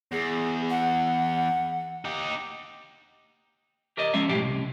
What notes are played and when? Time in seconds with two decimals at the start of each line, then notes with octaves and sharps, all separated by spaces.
0.12 E2 G#4
0.69 F#5
2.05 D#4 G4
3.97 G4 A#4 D5 D#5
4.13 F3 G#3 C#4 E5 F5
4.29 B1 A2 G#3 G4 F5 G5
4.44 C2